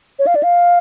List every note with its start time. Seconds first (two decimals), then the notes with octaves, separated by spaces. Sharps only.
0.19 C#5
0.27 F5
0.35 D5
0.43 F5